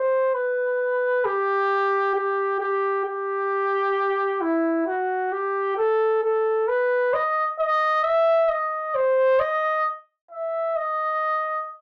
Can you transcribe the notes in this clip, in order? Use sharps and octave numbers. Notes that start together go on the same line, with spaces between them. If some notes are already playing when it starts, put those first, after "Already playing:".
Already playing: C5
B4
G4
G4
G4
G4
E4
F#4
G4
A4
A4
B4
D#5
D#5
E5
D#5
C5
D#5
E5
D#5